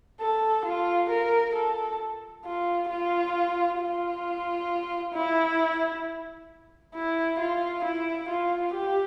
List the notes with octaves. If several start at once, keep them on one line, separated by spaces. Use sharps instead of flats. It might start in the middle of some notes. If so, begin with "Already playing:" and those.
A4
F4
A#4
A4
F4
F4
F4
E4
E4
F4
E4
F4
G4